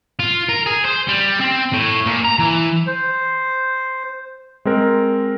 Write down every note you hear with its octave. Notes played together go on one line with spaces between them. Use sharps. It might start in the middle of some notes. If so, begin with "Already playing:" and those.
F4
A#4
G#4
C5
G3
C4
A2
A#2
A#5
E3
C5
G#3 C4 A#4